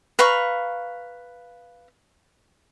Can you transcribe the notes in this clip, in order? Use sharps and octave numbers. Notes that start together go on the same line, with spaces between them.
B4 F5 A#5 C#6